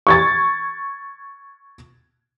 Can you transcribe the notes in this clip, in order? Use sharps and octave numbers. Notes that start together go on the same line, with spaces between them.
C#6 G#6 A6